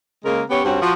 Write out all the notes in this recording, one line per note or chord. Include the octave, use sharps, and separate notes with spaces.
C#3 G#3 A#3 A#4
B3 C#4 G4 C#5
G2 C4 C#4 F#4
F3 F#4